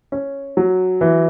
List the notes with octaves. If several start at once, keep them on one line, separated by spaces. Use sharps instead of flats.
C#4
F#3
E3